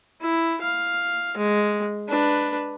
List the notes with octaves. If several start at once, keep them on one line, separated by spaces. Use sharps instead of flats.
E4
F5
G#3
D4 B4